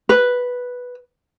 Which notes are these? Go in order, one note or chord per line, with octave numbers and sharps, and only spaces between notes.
B4